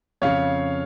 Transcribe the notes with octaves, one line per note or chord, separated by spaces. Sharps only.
F2 C#3 C#5 F5